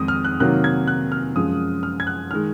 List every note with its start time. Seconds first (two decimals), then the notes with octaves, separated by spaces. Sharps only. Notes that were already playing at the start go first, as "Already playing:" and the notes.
Already playing: F2 D#3 G#3 D#6
0.08 F6
0.24 F#6
0.40 C3 D#3 F#3 A#3 F#6
0.64 G#6
0.87 F#6
1.12 F6
1.35 F#2 F3 G#3 D#6
1.83 F6
2.00 G#6
2.07 F#6
2.31 D#3 G#3 F6